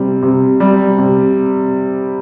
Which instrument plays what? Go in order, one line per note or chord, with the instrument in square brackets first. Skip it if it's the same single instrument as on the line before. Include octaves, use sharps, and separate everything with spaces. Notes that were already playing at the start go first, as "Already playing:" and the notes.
Already playing: [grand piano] C3 G3
C3
G3
C3